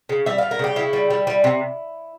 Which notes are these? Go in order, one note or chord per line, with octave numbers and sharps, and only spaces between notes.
C#3
G3 E5
G3 F5
A#4
C#3 G4
C#3 E4
G3
G3
G3
C3